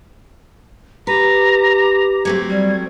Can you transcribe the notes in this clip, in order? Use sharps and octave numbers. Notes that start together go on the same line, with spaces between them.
G4 B4 A#5
F#3 A3 C4 G#6
G3